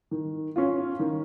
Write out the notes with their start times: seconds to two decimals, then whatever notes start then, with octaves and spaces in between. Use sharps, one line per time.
0.11 D#3
0.56 C#4 F4
0.99 D#3